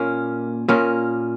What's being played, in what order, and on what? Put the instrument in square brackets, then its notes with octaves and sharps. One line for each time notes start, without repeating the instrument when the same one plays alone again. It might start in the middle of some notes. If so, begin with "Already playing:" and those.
Already playing: [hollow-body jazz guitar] A#2 A#3 C#4
A#2 A#3 C#4